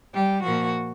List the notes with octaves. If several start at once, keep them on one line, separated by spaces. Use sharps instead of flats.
G3 G4
A#2 F3 A#3 F#4